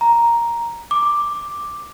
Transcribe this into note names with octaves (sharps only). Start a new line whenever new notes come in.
A#5
D6